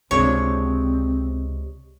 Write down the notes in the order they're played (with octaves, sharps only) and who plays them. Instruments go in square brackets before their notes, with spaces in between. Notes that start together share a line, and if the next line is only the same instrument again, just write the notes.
[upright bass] C#2 [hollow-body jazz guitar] C3 G#3 D4 [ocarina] C4 [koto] C#5